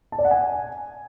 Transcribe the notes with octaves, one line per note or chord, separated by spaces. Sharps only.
A5
D5
F#5
G#5